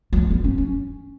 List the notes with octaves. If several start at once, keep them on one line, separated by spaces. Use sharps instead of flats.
F#3
G#3
B3
C#4
C#4